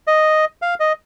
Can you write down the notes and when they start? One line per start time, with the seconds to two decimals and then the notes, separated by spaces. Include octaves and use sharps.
0.07 D#5
0.62 F5
0.80 D#5